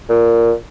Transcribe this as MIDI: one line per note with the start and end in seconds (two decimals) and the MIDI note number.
0.09 0.53 46